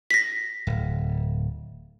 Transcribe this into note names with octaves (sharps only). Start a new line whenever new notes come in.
A#6 B6
D1